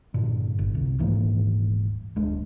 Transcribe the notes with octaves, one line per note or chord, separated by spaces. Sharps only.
G2 A#2 D3
G1
C2
D#1 G#2 E3 A#3
D1 G#3 D4